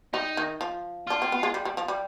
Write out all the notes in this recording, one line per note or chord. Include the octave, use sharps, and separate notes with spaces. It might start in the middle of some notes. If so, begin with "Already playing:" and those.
G3 D#4
D#3
F3
D4 F4
C4
B3
G#3
G3
G3
F3
G3